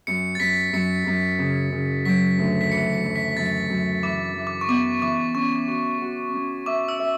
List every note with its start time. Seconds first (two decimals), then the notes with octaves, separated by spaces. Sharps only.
0.07 F#2 C#7
0.35 A6
0.40 F#2 B6
0.73 F#2 C#7
1.07 F#2
1.39 C#3
1.72 C#3
2.05 F#3 B6
2.38 D2
2.61 B6
2.71 E3 C#7
2.93 C#7
3.04 F#2
3.16 B6
3.28 B6
3.37 F#2 A6
3.70 F#2
4.03 E3 D6
4.35 E3
4.47 D6
4.61 C#6
4.68 B3 D6
5.02 E3 D6
5.35 C#4 C#6
5.68 F#4
6.01 F#4
6.33 C#4
6.66 E5 D6
6.88 E6
6.99 E5